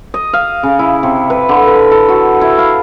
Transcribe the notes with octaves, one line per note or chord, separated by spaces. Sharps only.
D#5
F5
C#3
E4
C3
B4
D3
B4
A4
F#4
E4
F5